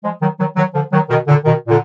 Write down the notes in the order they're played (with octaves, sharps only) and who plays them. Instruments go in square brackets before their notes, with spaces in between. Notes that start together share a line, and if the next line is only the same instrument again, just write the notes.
[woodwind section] F3 G#3
D#3 F#3
D#3 F#3
D#3 F#3
D3 F3
D#3 F#3
B2 D#3
A#2 D3
B2 D#3
A#2 D3